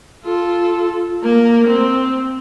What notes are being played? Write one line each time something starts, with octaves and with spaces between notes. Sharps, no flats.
F4 A4
A#3 A#4
C4